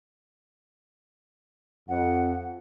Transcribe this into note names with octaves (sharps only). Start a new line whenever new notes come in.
F2 F#5